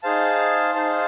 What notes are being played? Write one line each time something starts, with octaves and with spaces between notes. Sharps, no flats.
D#4 G#4 C5 F5 A5
D#4 G#4 C5 F5 A5